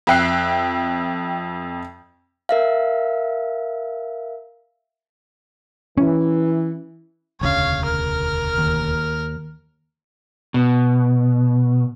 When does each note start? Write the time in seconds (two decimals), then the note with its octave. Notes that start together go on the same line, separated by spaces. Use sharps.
0.07 F2 E5 G5 F#6 C7
2.49 A#4 E5 F5
5.98 E3 C#4
7.41 E1 D2 C#3 C#5 F5
7.85 A#4 F6
8.58 D#2
10.54 B2